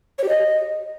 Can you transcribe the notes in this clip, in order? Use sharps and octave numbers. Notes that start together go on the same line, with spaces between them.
C#5
G4
D#5